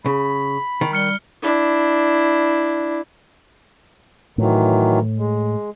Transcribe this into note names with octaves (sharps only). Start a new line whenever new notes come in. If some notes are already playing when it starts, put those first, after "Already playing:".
C#3 B5
D#3
G3 F6 C#7 G7
D4 E4
A2 D#3 E3 F#3
G#3